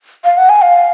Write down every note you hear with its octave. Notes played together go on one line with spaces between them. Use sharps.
F5
F#5
G#5
F5